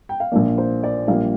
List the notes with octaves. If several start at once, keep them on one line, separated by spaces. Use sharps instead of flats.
G5
F5
A#1 A#2 F3 A#3 D5
C5
D5
A#1 A#2 G3 A#3 F5